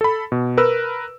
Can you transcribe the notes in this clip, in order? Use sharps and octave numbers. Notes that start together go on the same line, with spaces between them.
A4 B5
B2
A#4 B4 E6